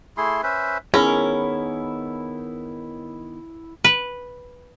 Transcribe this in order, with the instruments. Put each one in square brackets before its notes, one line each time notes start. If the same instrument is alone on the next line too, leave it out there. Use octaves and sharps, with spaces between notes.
[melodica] A3 E4 G#4 C6
C#4 B4 C5 E5
[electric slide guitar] D#3 B3 [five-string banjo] C#4 A#4 [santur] E4 [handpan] G#4
[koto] B4